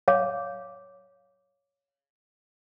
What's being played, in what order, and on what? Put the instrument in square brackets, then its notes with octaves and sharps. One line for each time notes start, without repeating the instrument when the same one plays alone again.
[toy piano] C#5 F5 D6